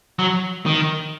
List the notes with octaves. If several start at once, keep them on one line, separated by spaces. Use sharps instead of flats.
F#3
D#3